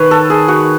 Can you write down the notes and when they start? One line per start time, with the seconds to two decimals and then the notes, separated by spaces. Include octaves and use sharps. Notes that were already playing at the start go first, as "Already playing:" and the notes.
Already playing: D#3 B4 C#5
0.11 A4
0.30 G#4
0.48 F#4